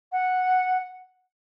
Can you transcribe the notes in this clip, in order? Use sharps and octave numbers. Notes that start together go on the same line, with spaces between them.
F#5